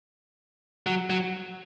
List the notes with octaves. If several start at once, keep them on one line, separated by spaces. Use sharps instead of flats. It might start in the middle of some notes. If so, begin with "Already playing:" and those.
F#3
F#3